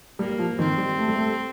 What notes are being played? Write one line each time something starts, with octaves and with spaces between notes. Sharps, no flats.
G3 A#3
F3
D#3 C4
G3
A3
G3
A3